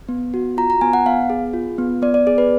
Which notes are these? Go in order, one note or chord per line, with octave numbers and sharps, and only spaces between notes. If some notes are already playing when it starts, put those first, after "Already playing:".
B3
F#4
F4 A#5
A#5
B3 G#5
F#5
B3 F5
G#4
F4
B3
B3 D5
D5
G#4 D5
B4